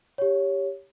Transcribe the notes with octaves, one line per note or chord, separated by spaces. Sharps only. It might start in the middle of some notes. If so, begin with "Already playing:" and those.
G4 C#5